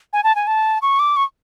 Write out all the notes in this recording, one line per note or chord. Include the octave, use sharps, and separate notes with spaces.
G#5
A5
G#5
A5
C#6
D6
C#6